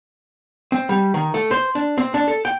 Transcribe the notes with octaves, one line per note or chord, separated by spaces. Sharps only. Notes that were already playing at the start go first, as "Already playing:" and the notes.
C4
G3
D#3
A3
C5
D4
C4
D4
A4
G5